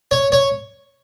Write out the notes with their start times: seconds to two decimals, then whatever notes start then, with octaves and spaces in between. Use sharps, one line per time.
0.11 C#5
0.32 C#5